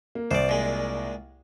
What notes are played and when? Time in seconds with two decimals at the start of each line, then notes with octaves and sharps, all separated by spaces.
0.15 A#3
0.31 C2 C5 D5
0.49 A#2 G#3